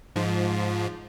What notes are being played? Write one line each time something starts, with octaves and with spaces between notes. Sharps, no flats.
G#2 F3